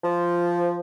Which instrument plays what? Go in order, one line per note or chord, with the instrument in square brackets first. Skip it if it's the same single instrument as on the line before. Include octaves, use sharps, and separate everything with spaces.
[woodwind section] F3